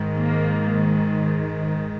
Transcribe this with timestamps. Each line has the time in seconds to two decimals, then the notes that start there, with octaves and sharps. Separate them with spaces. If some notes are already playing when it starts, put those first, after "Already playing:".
Already playing: G#2 D#3
0.17 A#3